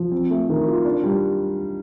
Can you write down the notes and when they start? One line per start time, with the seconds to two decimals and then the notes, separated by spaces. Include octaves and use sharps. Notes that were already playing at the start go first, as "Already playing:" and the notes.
Already playing: F3
0.12 C4
0.31 A3
0.49 D#3
0.67 F4
0.85 D4
1.03 G3